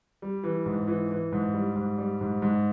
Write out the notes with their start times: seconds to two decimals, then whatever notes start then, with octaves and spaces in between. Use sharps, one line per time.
0.22 G3
0.43 E3
0.66 G#2
0.88 E3
1.11 E3
1.32 G#2
1.54 G3
1.76 G#2
1.98 G3
2.21 G#2
2.42 G#2